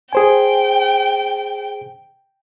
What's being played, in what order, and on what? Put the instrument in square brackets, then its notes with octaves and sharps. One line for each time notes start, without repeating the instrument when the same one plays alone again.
[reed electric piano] G#4 C5 G#5 [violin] G5